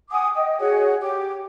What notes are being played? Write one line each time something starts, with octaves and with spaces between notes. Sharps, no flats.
F#5 G#5 D6 D#6
D#5 G5
F#4 G#4 C#5 F#5
G4 D6